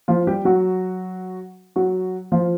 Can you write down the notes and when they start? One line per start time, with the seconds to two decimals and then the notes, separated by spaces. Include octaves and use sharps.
0.08 F3 F4
0.27 G3 G4
0.45 F#3 F#4
1.76 F#3 F#4
2.32 F3 F4